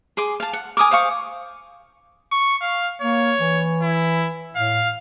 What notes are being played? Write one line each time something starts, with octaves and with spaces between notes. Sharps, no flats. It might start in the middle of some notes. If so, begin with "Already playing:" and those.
G#4 C6 D6
F5 A5
F#5
A#4 G#5 D6 D#6
C5 F5 C#6
C#6
F5
A#3 C#5
E3
E4
A2 F5